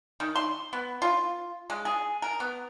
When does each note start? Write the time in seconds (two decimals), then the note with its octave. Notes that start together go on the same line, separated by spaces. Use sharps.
0.20 D#3
0.35 C6
0.73 B3
1.02 F4
1.70 G#3
1.85 G#4
2.22 A#4
2.40 B3